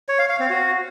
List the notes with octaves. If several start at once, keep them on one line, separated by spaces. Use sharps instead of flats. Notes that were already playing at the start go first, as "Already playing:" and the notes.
C#5
F5
F5
C4
F#4